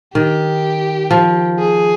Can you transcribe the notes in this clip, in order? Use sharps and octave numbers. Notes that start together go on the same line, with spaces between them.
D#3 G4
F3
G#4